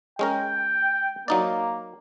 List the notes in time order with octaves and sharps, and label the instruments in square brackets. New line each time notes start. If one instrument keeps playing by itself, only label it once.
[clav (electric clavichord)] G#3 C#4 A#4 [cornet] G5
[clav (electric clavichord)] F#3 D#4 D5 [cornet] A#3